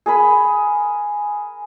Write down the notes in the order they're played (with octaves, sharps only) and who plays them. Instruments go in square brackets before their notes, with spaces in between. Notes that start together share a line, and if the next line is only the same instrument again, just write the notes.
[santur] G#4 A#4 G#5 B5